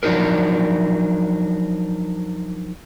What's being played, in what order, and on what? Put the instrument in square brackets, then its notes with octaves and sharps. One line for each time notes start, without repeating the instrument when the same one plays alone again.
[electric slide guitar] F3 F#3 D4 D#4 G#4 A#4